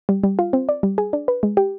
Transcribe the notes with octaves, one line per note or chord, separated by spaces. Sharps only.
G3
G3
F4
C4
D5
G3
G#4
D4
B4
G#3
G4